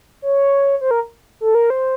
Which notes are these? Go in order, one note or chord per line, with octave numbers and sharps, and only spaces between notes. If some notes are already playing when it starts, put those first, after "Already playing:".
C#5
C5
A#4
A4
A#4
C5